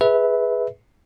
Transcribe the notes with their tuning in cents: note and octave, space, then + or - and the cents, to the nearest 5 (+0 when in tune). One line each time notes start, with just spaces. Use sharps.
G#4 +0 B4 +0 E5 -20